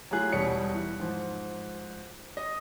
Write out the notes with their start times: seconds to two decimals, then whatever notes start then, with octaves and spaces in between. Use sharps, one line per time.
0.11 F#3 A3 E4 F4 G#4 F#6
0.32 E1 B2 G3 C#4 C#5 C#7
0.75 E3
1.00 G#2 F3
2.37 D#5